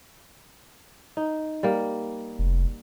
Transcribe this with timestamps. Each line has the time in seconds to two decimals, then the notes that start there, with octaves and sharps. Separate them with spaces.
1.17 D#4
1.63 G3 A#3
2.39 F1